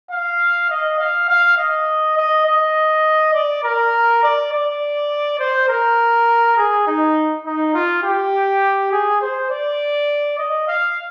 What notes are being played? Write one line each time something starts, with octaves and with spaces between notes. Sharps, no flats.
F5
D#5
F5
F5
D#5
D#5
D#5
D5
A#4
D5
D5
C5
A#4
G#4
D#4
D#4
F4
G4
G#4
C5
D5
D#5
F5